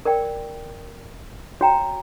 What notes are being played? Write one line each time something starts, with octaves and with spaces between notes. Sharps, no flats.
A#4 D5 G5
F#4 C#5 G5 A#5